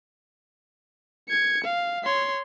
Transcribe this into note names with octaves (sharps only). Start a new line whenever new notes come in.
G#6 C#7
F5
C#5 C6